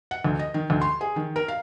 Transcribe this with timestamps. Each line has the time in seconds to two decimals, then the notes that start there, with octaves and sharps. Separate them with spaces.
0.11 F#5
0.24 D2
0.39 D#5
0.54 D#3
0.70 D2
0.81 C6
1.01 G#4
1.16 D#3
1.36 A#4
1.48 F5